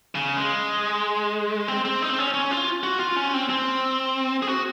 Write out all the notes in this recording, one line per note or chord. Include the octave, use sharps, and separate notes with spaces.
C#3
G#3
C4
C4
D#4
C4
C#4
C#4
F4
F#4
F4
C#4
C4
C4
G#4
F#4